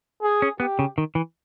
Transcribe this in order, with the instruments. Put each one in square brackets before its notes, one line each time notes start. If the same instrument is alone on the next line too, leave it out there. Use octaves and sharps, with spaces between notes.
[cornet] G#4
[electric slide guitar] C#4
[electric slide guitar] B3 [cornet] G4
[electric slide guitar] C#3
D#3
E3